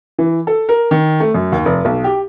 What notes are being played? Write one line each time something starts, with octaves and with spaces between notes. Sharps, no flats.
E3
A4
A#4
D#3
A3
F#2
D#2
F1
B1
G4